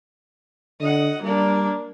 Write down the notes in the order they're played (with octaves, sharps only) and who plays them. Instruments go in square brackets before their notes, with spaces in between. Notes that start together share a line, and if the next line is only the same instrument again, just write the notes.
[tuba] D3 [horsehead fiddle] D#5 F#5
[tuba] G3 [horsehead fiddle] A#3 D4